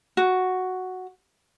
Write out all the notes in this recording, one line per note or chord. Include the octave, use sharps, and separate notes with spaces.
F#4